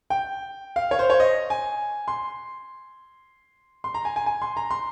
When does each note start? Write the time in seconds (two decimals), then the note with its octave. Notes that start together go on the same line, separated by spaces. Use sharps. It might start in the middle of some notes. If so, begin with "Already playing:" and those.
0.10 G5
0.76 F5
0.91 C#5
0.99 C5
1.10 C#5
1.20 D#5
1.50 G#5
2.08 C6
3.84 C6
3.94 A#5
4.05 G#5
4.16 G#5
4.26 G#5
4.42 C6
4.57 A#5
4.71 C6